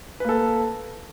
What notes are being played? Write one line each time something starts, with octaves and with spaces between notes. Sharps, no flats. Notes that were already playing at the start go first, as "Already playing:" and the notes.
A#3 A4 B4